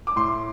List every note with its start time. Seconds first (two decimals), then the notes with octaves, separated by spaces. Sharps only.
0.07 D6
0.16 A2 C6